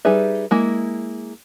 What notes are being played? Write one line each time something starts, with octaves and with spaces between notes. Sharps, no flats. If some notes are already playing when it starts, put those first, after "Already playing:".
G3 D#4 G#4 B4 E5
G#3 A#3 E4